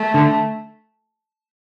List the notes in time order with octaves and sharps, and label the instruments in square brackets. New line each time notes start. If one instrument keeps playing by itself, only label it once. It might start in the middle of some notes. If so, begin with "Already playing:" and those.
Already playing: [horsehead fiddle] A3
[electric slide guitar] D3